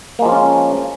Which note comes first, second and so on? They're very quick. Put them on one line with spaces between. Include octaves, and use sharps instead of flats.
A#3 G#3 F3 F4 C#4